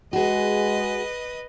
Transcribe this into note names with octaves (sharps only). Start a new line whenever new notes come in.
G#3 F#4 G#4 B4 D#5